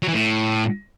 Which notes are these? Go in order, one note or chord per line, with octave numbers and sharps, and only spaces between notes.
F#3
E3
A2